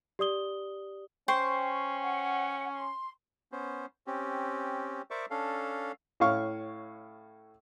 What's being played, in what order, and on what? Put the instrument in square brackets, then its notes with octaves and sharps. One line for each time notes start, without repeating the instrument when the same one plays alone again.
[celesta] G4 D5 D#6 G7
[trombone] C#4 [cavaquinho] C5 [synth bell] G5 C#6 C7
[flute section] F#5
C6
[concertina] B3 C#4 C5
C4 C#4 G4
A#4 C5 D5 E5 C#6 D6
C#4 D4 A4 F5
[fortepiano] A2 C#4 F5 C#6